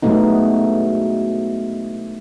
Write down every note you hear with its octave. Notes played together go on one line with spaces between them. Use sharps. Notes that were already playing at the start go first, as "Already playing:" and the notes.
B2 F#3 G#3 A3 B3 D#4